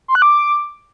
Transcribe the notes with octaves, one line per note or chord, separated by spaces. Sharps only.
C6
F#6
D6